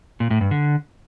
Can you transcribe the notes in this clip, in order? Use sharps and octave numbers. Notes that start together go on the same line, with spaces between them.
A#2
A2
G2
D3